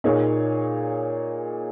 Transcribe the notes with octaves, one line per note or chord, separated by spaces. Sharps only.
A#2 A#3 D#4 G#4 C#5